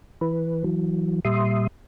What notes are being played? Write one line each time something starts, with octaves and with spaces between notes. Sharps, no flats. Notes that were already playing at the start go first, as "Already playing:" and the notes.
E3 B4
E3 F#3
A#2 G3 E5 C6 D#6